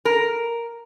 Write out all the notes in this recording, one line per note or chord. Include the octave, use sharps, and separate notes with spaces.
A#4